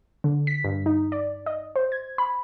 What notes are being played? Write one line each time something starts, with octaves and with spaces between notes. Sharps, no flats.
D3
B6
G2
D#4
D5
D#5
C5
G#6
B5